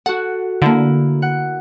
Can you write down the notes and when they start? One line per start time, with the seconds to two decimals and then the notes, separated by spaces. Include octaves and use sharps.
0.06 F#4 A4 F#5
0.62 D3 A#3 E4
1.22 F#5